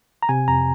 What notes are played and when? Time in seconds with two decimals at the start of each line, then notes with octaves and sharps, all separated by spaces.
0.23 A#5
0.29 C3 G#5
0.48 F2 A#5